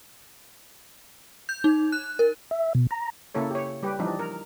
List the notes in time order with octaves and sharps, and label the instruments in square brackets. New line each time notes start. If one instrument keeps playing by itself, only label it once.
[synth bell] G6
D#4
F#6
A#4
[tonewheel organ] E5
B2
A#5
[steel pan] C#3 A#3 E4 A4 C#5
G4 C#5
G3 G4 B4
E3 F3 G3 D4 D#4
A#4